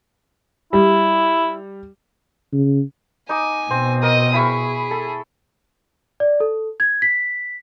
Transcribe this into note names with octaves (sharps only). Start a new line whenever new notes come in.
G3 E4
C#3
D#4 G#5 D6
B2 C4
A#4 D#5 D#6
E4 G#4 B5 C#6
A4
D5
A4
G#6
B6